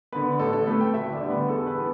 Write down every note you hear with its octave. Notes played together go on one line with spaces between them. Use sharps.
D3 B3 B4
A1 A4
A4
A2 A3 B4
G5
D2 E5
D5
D3 G3 B3
B4
E2 A4
B4
E3 B3